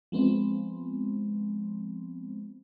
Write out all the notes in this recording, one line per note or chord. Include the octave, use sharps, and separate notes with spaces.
F3 G#3 B3 C4